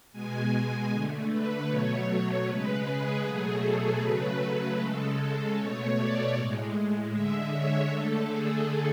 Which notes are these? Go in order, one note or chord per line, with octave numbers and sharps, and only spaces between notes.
B2 G#3 G#5
D3 A3
B4
B2 F#3 A3 C#5
C#3 G#3 B4
G#4
B2 F#3 A3 G#4
A4
C#3 F#3 A3 B4
C#3 G#3 A4
A4
B2 A3 C#5
D5
A2 G#3
D3 G#3 E5
C#5
D3 A3 A4
G#4